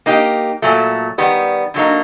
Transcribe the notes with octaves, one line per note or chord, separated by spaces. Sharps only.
A#3 D#4 G4
A#2 F#3 A3
D#3 G3 B3
D3 F#3 A#3 D#4